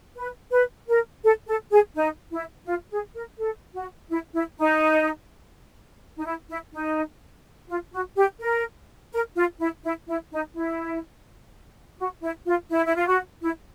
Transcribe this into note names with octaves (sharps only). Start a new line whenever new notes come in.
B4
B4
A#4
A4
A4
G#4
D#4
E4
F4
G#4
A#4
A4
F#4
E4
E4
D#4
D#4
E4
E4
D#4
F4
F#4
G4
A#4
A#4
F4
E4
E4
E4
D#4
E4
F#4
E4
F4
E4
E4
F4
F#4
E4